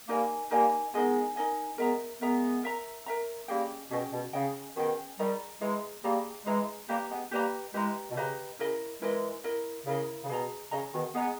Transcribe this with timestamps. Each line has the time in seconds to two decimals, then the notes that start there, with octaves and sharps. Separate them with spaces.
0.08 G3 A#3 D#4 A#4 D#5 G#5
0.51 G3 A#3 D#4 A#4 D#5 G#5
0.94 G#3 B3 D#4 A#4 D#5 G#5
1.36 D#4 A#4 D#5 G#5
1.78 G#3 B3 A#4 E5 A#5
2.21 G#3 B3 A#4 E5 A#5
2.63 A#4 E5 A#5
3.06 A#4 E5 A#5
3.48 G3 A#3 C#4 G#4 D#5 G5
3.91 B2 C#4 G#4 D#5 G5
4.13 B2
4.33 C#3 C#4 G#4 D#5 G5
4.76 B2 D#3 C#4 G#4 D#5 G5
5.19 D#3 G3 G#4 D#5 A#5
5.61 E3 G#3 G#4 D#5 A#5
6.04 G3 A#3 G#4 D#5 A#5
6.46 E3 G#3 G#4 D#5 A#5
6.89 G3 A#3 G4 B4 D#5 A#5
7.10 G#3 B3
7.31 G3 A#3 G4 B4 D#5 A#5
7.74 E3 G#3 G4 B4 D#5 A#5
8.11 B2
8.16 C#3 G4 B4 D#5 A#5
8.59 C#3 E4 A#4 D#5
9.02 E3 G#3 E4 A#4 D#5
9.44 E4 A#4 D#5
9.86 C#3 E4 A#4 D#5
10.24 C#3
10.29 B2 G#4 D#5 A#5
10.71 C#3 G#4 D#5 A#5
10.93 B2 D#3
11.14 G#3 B3 G#4 D#5 A#5